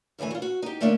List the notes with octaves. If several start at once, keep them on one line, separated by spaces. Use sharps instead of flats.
F#2 D3 E3 A3 G#5
F4 F#4
F#4
D#4 G4
D3 A3 A#3 C#4 D4